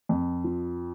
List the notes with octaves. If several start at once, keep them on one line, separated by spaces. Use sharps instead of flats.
F2
F3